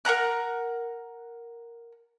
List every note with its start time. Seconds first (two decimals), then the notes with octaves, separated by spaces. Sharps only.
0.05 A#4 F#5 A#5 F#6